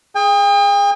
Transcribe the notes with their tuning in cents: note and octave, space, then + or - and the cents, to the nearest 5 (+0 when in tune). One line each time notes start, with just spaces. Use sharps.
G#4 +0 G5 +45